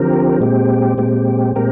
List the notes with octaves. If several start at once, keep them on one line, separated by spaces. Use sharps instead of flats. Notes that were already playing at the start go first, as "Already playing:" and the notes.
Already playing: D3 F3 C4 G4 A#4
A#2 G#3 C4 G4
A#2 G#3 C4 G4
A#2 G#3 C4 G4 A#4